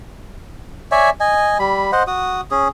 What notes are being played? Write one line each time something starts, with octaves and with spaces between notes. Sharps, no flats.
C#5 D5 E5 G#5
D#5 G#5
G3 B5
C5 D#5 F#5
F#4 D#6
C#4 G#4